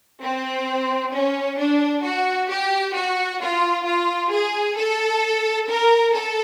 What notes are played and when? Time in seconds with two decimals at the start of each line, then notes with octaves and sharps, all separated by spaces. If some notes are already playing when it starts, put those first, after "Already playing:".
0.21 C4
1.12 C#4
1.58 D4
2.03 F#4
2.49 G4
2.94 F#4
3.40 F4
3.85 F4
4.30 G#4
4.76 A4
5.68 A#4
6.13 A4